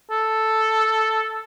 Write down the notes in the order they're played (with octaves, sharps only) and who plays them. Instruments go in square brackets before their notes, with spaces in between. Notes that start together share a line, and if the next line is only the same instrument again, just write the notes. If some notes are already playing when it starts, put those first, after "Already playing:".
[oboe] A4